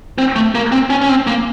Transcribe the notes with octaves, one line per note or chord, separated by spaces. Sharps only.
C4
A3
A#3
C4
C#4
C#4
C4
A#3